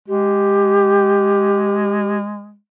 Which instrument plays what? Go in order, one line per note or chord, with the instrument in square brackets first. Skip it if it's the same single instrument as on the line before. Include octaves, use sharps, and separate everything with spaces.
[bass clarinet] G#3 [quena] G4